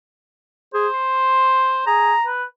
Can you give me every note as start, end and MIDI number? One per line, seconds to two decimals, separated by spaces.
0.74 0.88 68
0.74 1.85 72
0.93 1.75 84
1.87 2.13 68
1.87 2.28 82
2.26 2.44 71